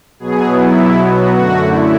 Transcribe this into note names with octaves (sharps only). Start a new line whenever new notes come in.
B2 F#3 B3 G#4
E4
F#4
F#2 D3 A3 F#4
E4